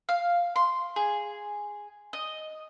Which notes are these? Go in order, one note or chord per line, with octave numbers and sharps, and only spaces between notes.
F5
C6
G#4
D#5